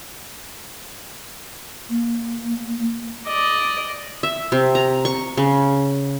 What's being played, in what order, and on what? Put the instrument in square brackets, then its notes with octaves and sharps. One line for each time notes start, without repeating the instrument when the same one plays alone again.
[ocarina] A#3
[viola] D5 D#5
[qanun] E5
C3
A#5
C#6
C#3